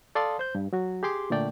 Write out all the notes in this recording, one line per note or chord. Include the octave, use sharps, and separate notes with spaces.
A4 D5 F5 A5 C6 D#6
C5 G6
G2
F#3 F#4
G4 G#4 C6 D6
A#2 D3 A3 D5 G5